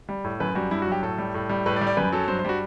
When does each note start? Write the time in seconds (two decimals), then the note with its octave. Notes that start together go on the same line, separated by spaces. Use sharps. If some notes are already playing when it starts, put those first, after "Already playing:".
0.09 G3
0.24 A2
0.40 F#2 B4
0.55 G3 F#4
0.71 G2 E4
0.82 F#4
0.87 F#3 G4
1.03 A2 A4
1.18 G3
1.34 A2
1.49 G3
1.66 A2 B4
1.76 D5
1.81 G3
1.87 D5
1.97 F#2 B4
2.12 F#3 A4
2.28 G2 C5
2.39 C5
2.45 G3 F#4